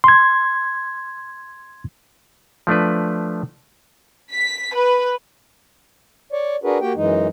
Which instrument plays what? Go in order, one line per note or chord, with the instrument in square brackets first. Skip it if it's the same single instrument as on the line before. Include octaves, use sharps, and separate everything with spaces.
[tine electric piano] C6 G#6
[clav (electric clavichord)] F3 A3 D4 B4
[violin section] B6
B4
[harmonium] C#5 D5
D4 F#4 G#4 A#4 B4
A#3 F#4 G4 G5
F#2 E3 G#3 D#4